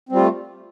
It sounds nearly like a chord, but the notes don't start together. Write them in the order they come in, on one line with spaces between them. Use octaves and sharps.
C4 G3 F4 A3